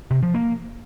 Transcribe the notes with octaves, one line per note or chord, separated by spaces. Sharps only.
C3
F3
A#3